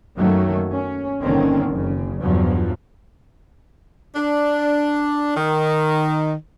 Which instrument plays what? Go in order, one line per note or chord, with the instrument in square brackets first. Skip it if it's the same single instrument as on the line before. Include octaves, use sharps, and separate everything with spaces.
[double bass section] F#2 D#3 F#3 A3 A#3
C#4
G1 A#2 D3 D#3 C4 C#4
F#1 C#3
E2 G2 F3 F#3
[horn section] D4
D#3